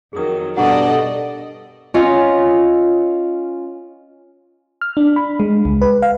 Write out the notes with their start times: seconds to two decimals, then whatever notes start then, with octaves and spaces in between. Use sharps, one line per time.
0.13 F2 D#3 F#3 G#4 D#6
0.57 G2 B2 A4 D5 D#5 F#5 A#5 C#6
1.94 C#4 F4 D#5
4.81 F6
4.97 D4
5.16 B5
5.40 G#3
5.65 C#2
5.82 B4
6.02 F5